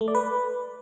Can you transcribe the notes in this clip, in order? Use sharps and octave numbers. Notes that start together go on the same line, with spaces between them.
A3
D5
B4